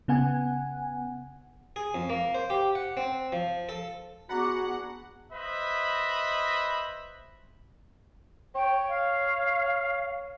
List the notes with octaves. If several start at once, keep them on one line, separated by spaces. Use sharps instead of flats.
C#3 B3 F#5 G#5
G#4
F2
A#3
C5
G4
F#5
C4
F3
A4
B3 D4 F#4 G#4 F#5 A#5 B5
B4 C5 D#5 E5 B5
C#5 G5
F5